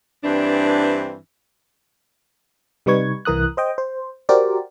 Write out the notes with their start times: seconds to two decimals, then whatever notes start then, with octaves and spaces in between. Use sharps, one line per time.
0.24 G2 E3 C4 D4
2.86 C3 G3 D#4 B4 C#6 G#6
3.25 C2 E3 A#4 D#6 F#6
3.57 C5 D#5 G5
3.78 C5
4.29 F#4 G4 A#4 C5 D5